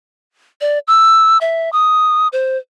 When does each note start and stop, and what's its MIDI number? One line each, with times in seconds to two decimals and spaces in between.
0.61 0.79 74
0.87 1.38 88
1.41 1.70 76
1.73 2.28 87
2.33 2.58 72